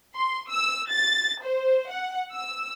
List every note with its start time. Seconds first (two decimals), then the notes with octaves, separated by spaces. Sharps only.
0.16 C6
0.50 E6
0.91 A6
1.44 C5
1.90 F#5
2.34 E6